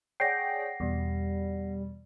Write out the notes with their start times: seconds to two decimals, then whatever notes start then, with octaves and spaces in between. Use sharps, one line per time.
0.20 G#4 C#5 D5 F#5 G5 A#6 C7
0.80 E2 B2 G3